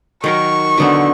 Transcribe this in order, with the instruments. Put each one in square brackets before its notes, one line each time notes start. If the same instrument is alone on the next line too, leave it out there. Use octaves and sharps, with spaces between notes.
[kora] D#3 F#3 A#4 [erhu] C#6
[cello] D3 [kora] F#3 B3 C4